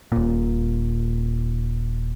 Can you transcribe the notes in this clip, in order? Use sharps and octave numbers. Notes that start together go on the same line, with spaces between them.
D#1 A#2